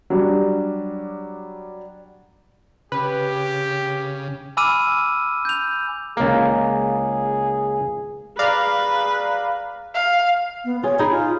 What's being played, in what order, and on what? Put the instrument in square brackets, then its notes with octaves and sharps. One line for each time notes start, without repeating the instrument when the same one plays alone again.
[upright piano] F#3 G3 D4
[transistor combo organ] C#3 [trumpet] G4 [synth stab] B4
[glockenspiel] G#5 B5 D6 E6 F6 D#7
G6 F7
[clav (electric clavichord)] C#2 A#3 [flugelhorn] G#4
[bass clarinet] G#4 [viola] B4 [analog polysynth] D5 F5 A#5
[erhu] F5
[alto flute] B3
[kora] F4 G#4 [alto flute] C#5
[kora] D#4 G#4 [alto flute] B5
[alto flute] F4